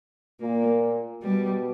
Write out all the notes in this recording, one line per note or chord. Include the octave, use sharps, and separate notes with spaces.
A#2 A#3
B2 G3